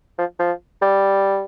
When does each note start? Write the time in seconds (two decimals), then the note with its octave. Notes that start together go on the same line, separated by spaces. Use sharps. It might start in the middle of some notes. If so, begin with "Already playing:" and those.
0.18 F3
0.39 F3
0.82 G3